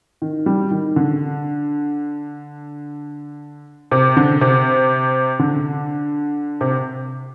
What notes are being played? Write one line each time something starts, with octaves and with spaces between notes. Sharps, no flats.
D#3
G3
D#3
D3
C3
D3
C3
D3
C3